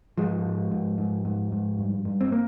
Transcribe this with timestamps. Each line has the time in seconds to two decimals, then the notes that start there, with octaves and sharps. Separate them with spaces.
0.18 G#2 F3 G#3
0.45 G#2
0.71 G#2
0.98 G#2
1.25 G#2
1.52 G#2
1.79 G2
2.05 G2
2.21 C4
2.32 A#3